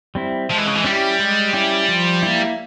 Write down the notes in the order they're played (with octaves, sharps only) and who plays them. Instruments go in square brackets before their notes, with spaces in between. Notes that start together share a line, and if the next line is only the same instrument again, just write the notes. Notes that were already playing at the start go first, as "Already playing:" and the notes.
[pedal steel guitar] G3 C4 E4
[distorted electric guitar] F3 [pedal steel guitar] G#3
[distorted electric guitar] E3
C#3
E3
[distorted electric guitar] G3 [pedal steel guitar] C#4 E4 G4
[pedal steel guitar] G#3
C#4 E4 G4
F3
A#3 E4